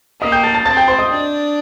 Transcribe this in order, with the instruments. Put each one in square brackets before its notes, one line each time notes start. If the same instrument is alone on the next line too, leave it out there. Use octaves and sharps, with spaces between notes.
[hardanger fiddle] A#3 [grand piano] D#5 D#6
[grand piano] G5 G6
A5 A6
A5 A6
[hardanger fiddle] C4 [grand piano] A5 A6
[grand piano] G5 G6
C5 C6
D#5 D#6
[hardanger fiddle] D4